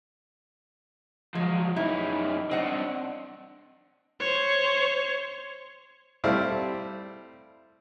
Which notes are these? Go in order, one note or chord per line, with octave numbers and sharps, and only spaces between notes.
F3 F#3 G#3
F#2 D#4 E4
C4 D4 D#5 F#5
C5 C#5
G3 A3 C4 E4 F5